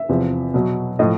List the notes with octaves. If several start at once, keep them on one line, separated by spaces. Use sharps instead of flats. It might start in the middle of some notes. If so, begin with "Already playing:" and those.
Already playing: E5
E2 C3 F3
B2 F#3
A2 F3 D#5